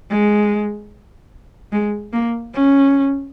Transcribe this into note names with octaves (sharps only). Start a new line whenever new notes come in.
G#3
G#3
A#3
C#4